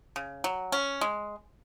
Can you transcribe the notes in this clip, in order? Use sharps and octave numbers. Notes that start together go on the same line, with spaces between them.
C#3
F#3
C#4
G#3